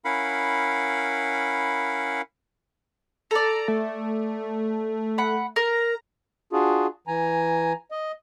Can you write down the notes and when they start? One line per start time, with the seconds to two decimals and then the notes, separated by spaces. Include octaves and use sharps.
0.05 C#4 E4 A#4 F5 F#5 B5
3.31 A4 D5 A#5
3.68 A3
5.18 F#5 B5
5.56 A#4 A#5
6.53 D4 F4 F#4 G#4
7.07 E3 G#5 A#5
7.91 D#5